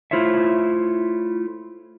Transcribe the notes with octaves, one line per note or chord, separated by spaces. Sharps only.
A3 E4 F4 C5 C#5 E5